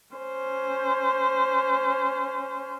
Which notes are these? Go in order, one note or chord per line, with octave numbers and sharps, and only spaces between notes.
C#4 C5